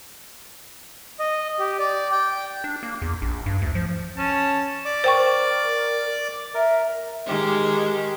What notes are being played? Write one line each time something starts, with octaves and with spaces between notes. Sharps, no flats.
D#5
G4
D5
G5
D4
A#3
E2
A#1
G2
D2
F3
C#4 A5
D5 D6
A#4 C5 G5 C#6
A#4 E5
D#3 G#3 G4